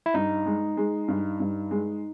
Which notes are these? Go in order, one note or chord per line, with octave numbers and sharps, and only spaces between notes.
E4
G2 D#4
G#3
G#3
G2
G2
G#3